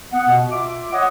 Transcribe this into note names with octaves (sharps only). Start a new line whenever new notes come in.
B3 F#5
B2
F4 E5 D6
C#5 D#5 F#5